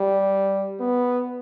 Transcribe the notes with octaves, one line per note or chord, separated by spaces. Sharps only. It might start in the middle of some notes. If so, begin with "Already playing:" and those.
Already playing: G3
B3